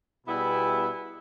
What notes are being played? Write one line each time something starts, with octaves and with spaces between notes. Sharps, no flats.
B2 G3 B3 E4 G#4